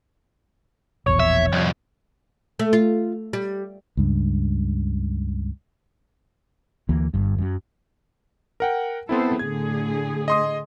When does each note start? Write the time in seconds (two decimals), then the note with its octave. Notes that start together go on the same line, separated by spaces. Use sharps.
1.06 E1 A#1 E2 C#5
1.20 E5
1.52 C2 F2
2.59 A3
2.73 F4
3.33 G3
3.97 C#2 G2
6.89 D2 E3 A#3
7.14 G1 G2
7.38 F#2 F#3
8.60 A#4 F#5 G5
9.09 B3 C4 E4 A4 C5
9.39 A2 D3 G#4 G#6
10.28 D#5 C6 D#6